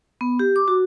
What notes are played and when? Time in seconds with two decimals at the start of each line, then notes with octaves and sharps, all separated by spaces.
0.21 B3
0.39 G4
0.56 D6
0.68 F#4